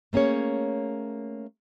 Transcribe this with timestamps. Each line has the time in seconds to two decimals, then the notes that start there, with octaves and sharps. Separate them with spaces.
0.13 A3 A#3 C#4 G#4 C#5